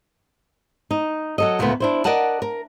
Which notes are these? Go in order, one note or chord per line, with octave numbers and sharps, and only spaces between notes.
D#4
F#3 A4 D#5
D2 A#2 C#3 A3 B3
D4 E4 C5
A#4 D5 D#5 F#5 A5
A#4